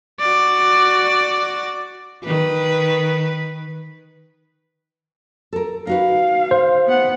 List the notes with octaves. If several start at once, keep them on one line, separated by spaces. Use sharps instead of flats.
F#4 D5
D#3 B4
A4 A#4
D#4 F#4 B4 F5
C5
B3 F#5